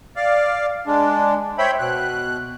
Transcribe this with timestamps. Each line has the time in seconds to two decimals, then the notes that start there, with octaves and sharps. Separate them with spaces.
0.16 D5 F5
0.87 G#3 D4
1.58 C5 C#5 E5 G5 B5
1.79 B2 F#6